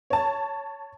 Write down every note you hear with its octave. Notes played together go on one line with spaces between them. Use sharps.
C#5 A5